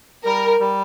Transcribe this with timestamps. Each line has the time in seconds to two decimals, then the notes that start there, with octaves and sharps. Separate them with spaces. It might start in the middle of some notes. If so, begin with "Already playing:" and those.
0.25 G3 A#4
0.60 G3